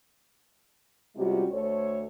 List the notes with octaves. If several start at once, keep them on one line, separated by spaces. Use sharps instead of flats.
C3 G3 G#3 C#4 F4 F#4
D2 A3 A4 C5 C#5